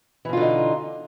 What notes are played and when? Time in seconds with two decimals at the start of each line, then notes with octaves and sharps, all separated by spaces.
0.25 E3
0.29 B2
0.33 F4
0.37 D3
0.41 D#4